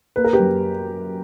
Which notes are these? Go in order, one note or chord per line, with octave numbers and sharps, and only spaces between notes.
A#3 B4
A#4
G4 B4
F#2